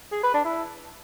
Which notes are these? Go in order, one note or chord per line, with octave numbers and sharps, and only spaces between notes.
G#4
B4
D4
E4